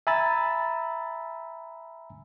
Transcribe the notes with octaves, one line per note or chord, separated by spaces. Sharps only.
E5 G#5 A#5 B5 E6 A6